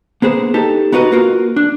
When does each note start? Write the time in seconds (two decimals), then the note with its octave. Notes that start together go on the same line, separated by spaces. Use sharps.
0.22 A#3 B3 G#4 C5
0.54 D#4 G4 A4
0.92 B3 D#4 F#4 B4 D#5
1.12 A#3 F4 F#4 A#4
1.56 D4